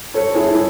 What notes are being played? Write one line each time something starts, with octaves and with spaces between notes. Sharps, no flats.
A4 C#5
E4 G#4
E4 G#4